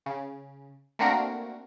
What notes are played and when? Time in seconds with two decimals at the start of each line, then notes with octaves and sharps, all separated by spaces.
0.06 C#3
0.99 A3 A#3 C4 D4 F#4 A#4